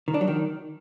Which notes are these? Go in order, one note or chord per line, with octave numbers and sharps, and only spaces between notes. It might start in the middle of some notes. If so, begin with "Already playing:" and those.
D#3
D4
F#3
D#3